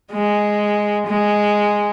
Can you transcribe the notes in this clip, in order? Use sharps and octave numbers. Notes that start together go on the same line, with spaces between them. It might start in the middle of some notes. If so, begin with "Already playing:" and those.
G#3
G#3